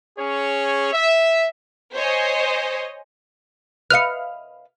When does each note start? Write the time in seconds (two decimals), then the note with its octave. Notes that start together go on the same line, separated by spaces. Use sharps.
0.19 C#4 G#4 C#5
0.92 E5
1.94 C5 C#5 D#5 G#5
3.90 B4 D#5 F5 F6 F#6 C#7